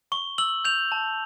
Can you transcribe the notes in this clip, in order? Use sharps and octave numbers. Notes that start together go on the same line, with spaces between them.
C#6 G7
E6 F#7
G6 F7
A5